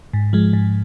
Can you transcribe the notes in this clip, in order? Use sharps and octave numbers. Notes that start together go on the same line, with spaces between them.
G#2
F3 G#3
G#2